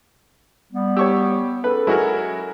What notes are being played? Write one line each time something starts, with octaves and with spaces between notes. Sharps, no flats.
G3 B3
G4 C#5 C#6 E6
C#4 G#4 A4 B4
F#3 G#3 E4 F#4 A#4